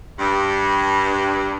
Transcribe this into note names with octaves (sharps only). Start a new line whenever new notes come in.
G2